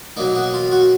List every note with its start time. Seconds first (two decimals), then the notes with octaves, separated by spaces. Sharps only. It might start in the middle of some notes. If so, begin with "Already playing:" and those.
0.17 B2 F#3 A#3 D#4
0.35 F#4
0.54 F4
0.71 F#4